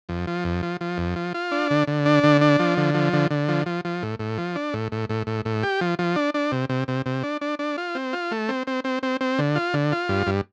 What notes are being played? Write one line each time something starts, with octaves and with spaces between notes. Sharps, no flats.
F2
F3
F2
F3
F3
F2
F3
F4
D4
D3
D3
D4
D3
D4
F3
D3
F3
D3
D3
F3
F3
F3
A2
A2
F3
D4
A2
A2
A2
A2
A2
G4
F3
F3
D4
D4
C3
C3
C3
C3
D4
D4
D4
F4
C4
F4
A3
C4
C4
C4
C4
C4
D3
F4
D3
F4
G2
G2